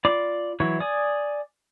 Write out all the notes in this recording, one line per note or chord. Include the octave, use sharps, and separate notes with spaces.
F4 D5 B5 D6
E3 F#3 E4 C#5
D5 G#5 D#6